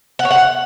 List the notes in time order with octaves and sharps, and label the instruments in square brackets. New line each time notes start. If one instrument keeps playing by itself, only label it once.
[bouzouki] F#5
C#5
F#5